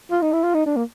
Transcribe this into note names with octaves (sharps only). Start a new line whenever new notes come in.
F4
D#4
E4
F4
D#4
D4
A#3